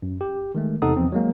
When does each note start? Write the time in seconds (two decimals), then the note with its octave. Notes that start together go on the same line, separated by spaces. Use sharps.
0.02 F#2
0.21 G4
0.55 D#3 G#3 A3
0.82 E2 C3 D#4 A4 F#5 D#6
0.96 E2 F3 C4
1.12 F#3 G#3 A#3